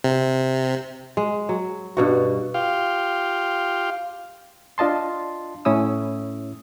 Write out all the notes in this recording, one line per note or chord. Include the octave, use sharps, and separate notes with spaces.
C3
G#3
F#3
G2 B2 F#4
F4 G4 F5
D4 F4 D#5 A5 C6
A2 C#4 E4 D#6 E6